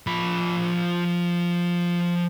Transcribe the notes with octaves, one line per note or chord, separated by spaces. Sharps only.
F3 B5